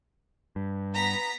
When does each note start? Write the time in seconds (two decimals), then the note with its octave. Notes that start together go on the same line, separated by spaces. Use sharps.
0.56 G2
0.95 B3 A#5 B6